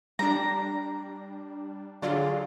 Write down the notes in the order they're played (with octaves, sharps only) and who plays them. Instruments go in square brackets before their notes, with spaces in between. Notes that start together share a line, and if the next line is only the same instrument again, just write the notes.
[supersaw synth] G3 D4 [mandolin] A#5
[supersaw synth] D3 F#3 F4 [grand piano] G#4 D5 [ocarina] F5